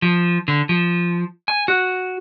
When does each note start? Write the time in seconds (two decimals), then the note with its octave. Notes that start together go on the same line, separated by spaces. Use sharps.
0.02 F3
0.48 D3
0.69 F3
1.48 G#5
1.68 F#4